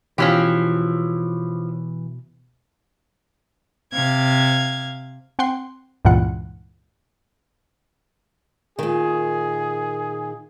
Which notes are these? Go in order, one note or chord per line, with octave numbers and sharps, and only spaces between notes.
B2 E3 F3 C#4 G4
C3 F5 G#6
C4 F#5 G5 C6
C#2 G2 A#2 E3 F4 F#5
A#2 D#3 G#4